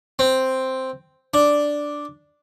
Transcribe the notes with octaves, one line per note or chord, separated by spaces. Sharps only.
C4
D4